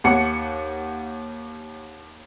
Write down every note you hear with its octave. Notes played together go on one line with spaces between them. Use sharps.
D#2 F#5 C#7